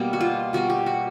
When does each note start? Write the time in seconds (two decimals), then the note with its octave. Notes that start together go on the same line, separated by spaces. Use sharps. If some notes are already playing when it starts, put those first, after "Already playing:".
Already playing: B2 G3 A#3
0.13 F#4
0.21 F4
0.53 B2 G3 A#3 F#4
0.70 G4
0.86 F#4